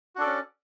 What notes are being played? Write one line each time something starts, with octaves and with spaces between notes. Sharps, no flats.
C#4 D4 F#4 A4 D5